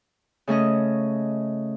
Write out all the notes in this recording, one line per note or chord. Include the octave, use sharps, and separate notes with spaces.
C#3 A3 C#4 D#5